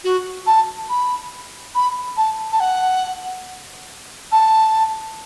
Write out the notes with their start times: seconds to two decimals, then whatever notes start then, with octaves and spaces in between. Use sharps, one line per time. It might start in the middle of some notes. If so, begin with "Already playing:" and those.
0.04 F#4
0.47 A5
0.89 B5
1.75 B5
2.17 A5
2.52 A5
2.60 F#5
4.32 A5